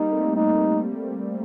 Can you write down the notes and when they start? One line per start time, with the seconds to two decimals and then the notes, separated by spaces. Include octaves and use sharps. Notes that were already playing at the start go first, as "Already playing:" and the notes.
Already playing: G3 A#3 D#4
0.11 A3 C4
0.35 G3 A#3 D#4